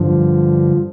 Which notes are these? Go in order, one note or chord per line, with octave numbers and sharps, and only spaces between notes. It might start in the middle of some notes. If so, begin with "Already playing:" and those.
Already playing: G2 D3 F3